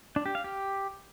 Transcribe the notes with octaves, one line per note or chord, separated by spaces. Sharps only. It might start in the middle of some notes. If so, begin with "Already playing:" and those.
D4
G4
F5
G4